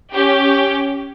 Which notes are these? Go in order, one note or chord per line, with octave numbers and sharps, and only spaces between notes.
C#4 G4